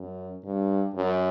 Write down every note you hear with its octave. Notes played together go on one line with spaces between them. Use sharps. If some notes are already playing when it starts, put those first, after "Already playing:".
Already playing: F#2
G2
F#2